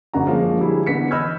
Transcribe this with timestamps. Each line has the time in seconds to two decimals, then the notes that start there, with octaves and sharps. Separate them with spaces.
0.14 F#1 F#2 D3 F#4 A#5
0.27 F3 G#3 A#3 C#4
0.58 D3 G3 E4 G#4
0.86 D3 E3 B3 B6 C#7
1.11 D#5 B5 E6 F6 G6 G#6